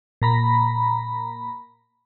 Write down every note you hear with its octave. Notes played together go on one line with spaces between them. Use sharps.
A#2 A#5 B5